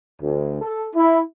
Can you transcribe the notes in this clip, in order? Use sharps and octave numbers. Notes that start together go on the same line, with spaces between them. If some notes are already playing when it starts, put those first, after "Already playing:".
D2
A4
E4